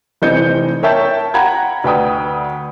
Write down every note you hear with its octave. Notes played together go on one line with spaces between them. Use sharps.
F1 E3 C4 D#5 G6 C#7
A#4 C#5 E5 G5 A5 G6
F#5 G5 A#5 B5 G#6
D2 B4 G5 D#6